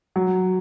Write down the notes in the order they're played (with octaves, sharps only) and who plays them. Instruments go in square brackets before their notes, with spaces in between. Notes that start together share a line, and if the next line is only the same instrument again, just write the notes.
[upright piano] F#3